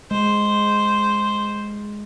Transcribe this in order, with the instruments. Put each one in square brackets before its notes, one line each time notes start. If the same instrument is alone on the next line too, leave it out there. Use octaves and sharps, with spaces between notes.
[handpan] G#3 [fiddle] C5